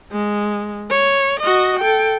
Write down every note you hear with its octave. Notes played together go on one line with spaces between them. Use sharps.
G#3
C#5
F#4 D#5
A4 G5